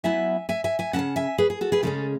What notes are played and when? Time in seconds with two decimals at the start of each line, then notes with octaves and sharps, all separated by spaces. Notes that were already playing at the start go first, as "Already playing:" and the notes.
0.04 F#3 B3 E4 E5 G#5
0.49 E5 G#5
0.64 E5 G#5
0.79 E5 G#5
0.93 F#3 C#4 F#5 A5
0.99 C#3
1.16 E5 G#5
1.38 G#4 B4
1.50 G#4
1.61 F#4 A4
1.72 G#4 B4
1.83 C#3 G#3 C#4 A4 C#5